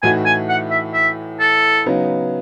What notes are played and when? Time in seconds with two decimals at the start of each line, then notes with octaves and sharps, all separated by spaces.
0.03 A2 E3 A3 D#4 F#4 G#5
0.26 G#5
0.49 F#5
0.71 E5
0.94 E5
1.40 A4
1.86 C#3 F#3 B3 D#4